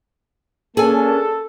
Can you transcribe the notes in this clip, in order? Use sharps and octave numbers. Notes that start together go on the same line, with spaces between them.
A#3 C#4 D4 G#4 A4 G#5